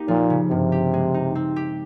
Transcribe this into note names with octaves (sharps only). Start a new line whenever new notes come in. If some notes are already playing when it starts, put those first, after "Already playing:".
Already playing: A#3 D#4 G4
A#2 F3
C#3
G2 C3
G4
G#3
D#4
C4
G4